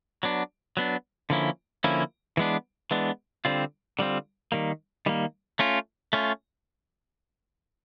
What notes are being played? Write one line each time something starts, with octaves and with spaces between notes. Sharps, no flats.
F#3 B3 D4
F#3 B3 D4
D3 F3 A#3 C#4 E4
D3 F3 A#3 C#4 E4
E3 G#3 B3 D4
E3 G#3 B3 D4
D3 G3 C4 F4
D3 G3 C4 F4
D#3 G3 A#3
D#3 G3 A#3
A3 C#4 F4
A3 C#4 F4